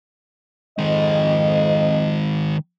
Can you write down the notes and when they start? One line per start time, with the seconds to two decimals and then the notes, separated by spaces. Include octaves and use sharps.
0.78 F2 D#3 G#3 D#5